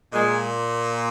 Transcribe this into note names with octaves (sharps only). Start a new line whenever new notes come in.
A#2 G#3